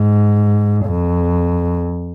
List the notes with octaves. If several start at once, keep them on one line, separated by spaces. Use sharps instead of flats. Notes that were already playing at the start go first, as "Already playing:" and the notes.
Already playing: G#2
F2